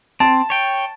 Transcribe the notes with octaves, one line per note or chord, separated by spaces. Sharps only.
C4 A5
C#5 G5